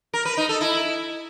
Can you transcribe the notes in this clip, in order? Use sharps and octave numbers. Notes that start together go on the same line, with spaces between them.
A#4
B4
D#4
A4
E4